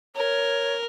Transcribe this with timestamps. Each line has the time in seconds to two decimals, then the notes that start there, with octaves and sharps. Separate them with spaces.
0.16 A#4 C#5